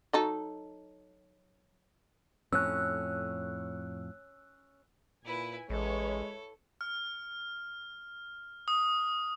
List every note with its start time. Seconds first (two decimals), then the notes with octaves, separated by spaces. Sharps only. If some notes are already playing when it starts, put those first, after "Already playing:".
0.13 F#3 D#4 A4
2.53 F2 A2 C#4 E6 F#6
5.25 A#2 E4 B4 G#5
5.70 A1 G#3 E4 A4 B4 C#5
6.81 F6
8.68 D#6